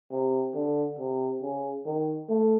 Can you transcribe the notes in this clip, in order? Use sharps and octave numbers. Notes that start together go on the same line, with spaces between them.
C3
D3
C3
C#3
D#3
A3